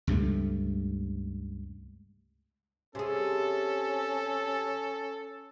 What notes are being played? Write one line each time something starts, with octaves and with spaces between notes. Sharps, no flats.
C#2 G2 C3 A3
C3 C#4 G#4 A4